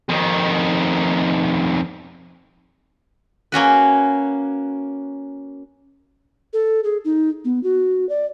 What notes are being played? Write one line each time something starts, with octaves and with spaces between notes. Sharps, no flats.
F2 D#3
A#3 C#4 F#4 B4
A4
G#4
D#4
B3
F#4
D5